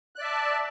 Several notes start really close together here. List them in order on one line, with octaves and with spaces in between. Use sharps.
F#6 D5 E5 A5